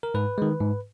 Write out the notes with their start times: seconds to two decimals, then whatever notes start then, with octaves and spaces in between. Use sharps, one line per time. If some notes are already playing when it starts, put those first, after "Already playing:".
0.03 A#4
0.14 G#2 B4
0.38 D#3 G#3
0.60 G#2